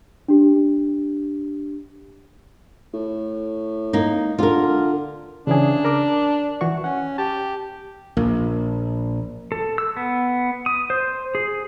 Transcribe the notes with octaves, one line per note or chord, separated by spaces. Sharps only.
D4 G4
A2
A#3 D#4
D3 F4 A#4
C#3 E3 D4 G#4
A#4 D6
E3 F#4 C#6
C#4 F#5
G4 A5
A#1 A#3
A4
E6
B3
D#6
C5
G#4